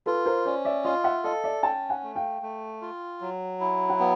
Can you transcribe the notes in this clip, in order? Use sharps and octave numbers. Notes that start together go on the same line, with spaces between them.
F4 A4 B4
A#4 C5
C#4 C5 D5
D5 E5
F4 D#5 F5
E5 F#5
A4 D#5 F5
D5 E5
C#4 G5 A5
F#5 G#5
A3
F5 G5
A3
F4
F#3
E4
F#5
B3 F5 G5